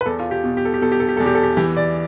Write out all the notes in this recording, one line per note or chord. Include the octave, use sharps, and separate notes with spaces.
B4
E2 A4
F4
G4
B2
G4
A4
G4
B2 A4
G4
A4
G4
E2 A4
G4
A4
G4
E3 G4
D5